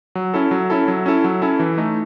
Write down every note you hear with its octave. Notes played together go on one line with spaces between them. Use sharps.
F#3
C#4 E4 A4
F#3
C#4 E4 A4
F#3
C#4 E4 A4
F#3
C#4 E4 A4
E3
A3 D#4